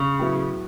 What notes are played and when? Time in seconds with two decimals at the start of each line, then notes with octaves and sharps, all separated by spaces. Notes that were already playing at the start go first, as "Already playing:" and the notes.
Already playing: C#3
0.19 A2 F#3 B3 E4